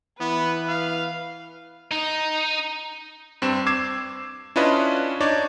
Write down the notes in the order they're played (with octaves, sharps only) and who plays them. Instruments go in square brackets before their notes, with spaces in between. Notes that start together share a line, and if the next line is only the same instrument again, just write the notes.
[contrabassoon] E3 [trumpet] B3 [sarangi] B4
[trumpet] F5
[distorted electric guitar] D#4
[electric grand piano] G2 C4 E7
D6 E6 G#6 C7 E7
C#4 D4 E4 F4 B4 D#5
D4 D#4 C#5 D5